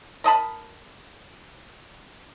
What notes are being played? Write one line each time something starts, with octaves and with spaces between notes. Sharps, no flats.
A#4 D#5 A5 B5